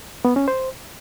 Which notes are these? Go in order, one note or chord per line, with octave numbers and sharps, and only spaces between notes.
B3
C#4
C5